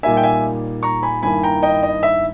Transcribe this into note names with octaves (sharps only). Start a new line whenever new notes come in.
A#2 G3 A#3 D#4 E5 G#5
G5
E5 G#5
A#5 C#6
G#5 B5
G2 D#3 A#3 E4 G#5 B5
G5 A#5
D#5 G5
D#5
E5